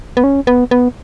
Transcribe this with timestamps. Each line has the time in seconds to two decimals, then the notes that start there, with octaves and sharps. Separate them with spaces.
0.17 B3
0.24 C#4
0.47 B3
0.71 B3